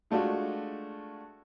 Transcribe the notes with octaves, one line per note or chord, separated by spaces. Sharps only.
G#3 A3 D4 F4 F#4